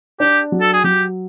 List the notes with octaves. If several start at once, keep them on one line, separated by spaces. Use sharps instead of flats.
D4 G4
F#3
A4
G#4
F#3 G4